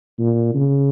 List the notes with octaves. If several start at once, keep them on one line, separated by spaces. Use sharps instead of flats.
A#2
C#3